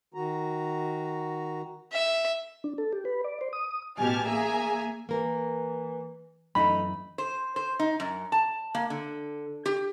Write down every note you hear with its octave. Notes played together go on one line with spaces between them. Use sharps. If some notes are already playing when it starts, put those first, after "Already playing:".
D#3 F#4 A#5
E5
D4
A4
G4
B4
D5
C5
D#6
A1 B2 G4 G#5 A5 F6
A#3 G#4 E5 G#5 A#5
E3 A#3 A#4
F#2 E3 A3 D#4 B5
C5
C5
D#4
F#2
A5
A#3
D3
G4